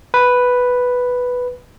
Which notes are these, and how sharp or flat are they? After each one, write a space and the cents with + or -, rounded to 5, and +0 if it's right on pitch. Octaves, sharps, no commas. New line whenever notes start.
B4 +0